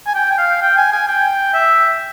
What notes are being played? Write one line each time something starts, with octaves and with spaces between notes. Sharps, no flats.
G#5
G5
G5
F5
G5
G#5
G#5
G5
E5